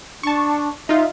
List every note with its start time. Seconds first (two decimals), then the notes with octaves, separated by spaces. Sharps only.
0.23 D4 A5 C#6
0.89 D#4 F4 E5